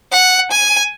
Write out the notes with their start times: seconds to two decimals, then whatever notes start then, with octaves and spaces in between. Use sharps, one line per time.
0.12 F#5
0.51 G#5